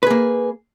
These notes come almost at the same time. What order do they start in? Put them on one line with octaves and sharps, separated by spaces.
B4 G#4 A#3